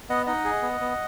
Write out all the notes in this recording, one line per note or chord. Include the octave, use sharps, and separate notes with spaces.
B3 D#5 F#5
D#4 D#5 F#5
G#4
B3
B3